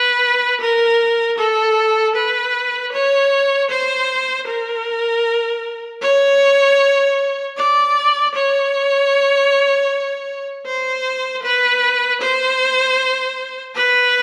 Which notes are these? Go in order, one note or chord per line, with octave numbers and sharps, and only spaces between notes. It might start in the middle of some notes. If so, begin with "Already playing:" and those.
Already playing: B4
A#4
A4
B4
C#5
C5
A#4
C#5
D5
C#5
C5
B4
C5
B4